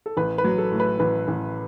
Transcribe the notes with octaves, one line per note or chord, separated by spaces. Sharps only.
A4
A1 B4
B4
F#3
A4
A2
B4
A1 B4
A1